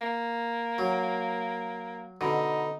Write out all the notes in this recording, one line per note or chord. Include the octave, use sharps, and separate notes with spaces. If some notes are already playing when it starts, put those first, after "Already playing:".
A#3
F#3
B2 D3 D#4